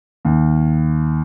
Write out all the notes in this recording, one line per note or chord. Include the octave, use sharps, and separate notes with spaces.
D#2